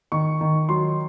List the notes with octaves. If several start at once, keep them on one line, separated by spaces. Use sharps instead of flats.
D#3 C#6
D#3
F#3 C6